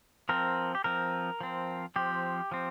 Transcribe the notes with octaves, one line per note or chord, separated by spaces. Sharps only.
F3 C4 A#4
G4
F3 C4 A#4
F3 C4
F3 C4 G4
F3 C4